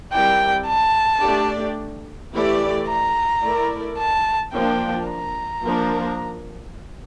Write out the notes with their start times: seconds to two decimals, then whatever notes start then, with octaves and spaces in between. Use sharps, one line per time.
0.12 G3 C4 E4 A#4 D5 G5
0.67 A5
1.22 A3 D4 G4 D5
2.33 E3 A3 E4 G4 D5
2.88 A#5
3.43 A3 E4 A#4 D5
3.98 A5
4.53 F3 A#3 D4 G5
5.09 A#5
5.64 F3 A#3 D4 F4 A#4